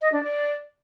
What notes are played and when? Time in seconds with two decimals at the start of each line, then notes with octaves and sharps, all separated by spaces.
0.01 D#5
0.12 D4
0.23 D5